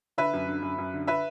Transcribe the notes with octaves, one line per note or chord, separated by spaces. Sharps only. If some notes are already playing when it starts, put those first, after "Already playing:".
D3 B4 E5
F#2
D3
F#2
F#2
D3
B4 E5